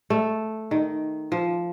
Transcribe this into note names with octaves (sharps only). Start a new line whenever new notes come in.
A3
D#3
F3